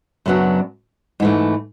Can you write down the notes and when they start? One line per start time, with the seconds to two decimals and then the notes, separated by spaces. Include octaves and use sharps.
0.26 F#2 C#3 F#3 B3 D4
1.20 G#2 E3 A3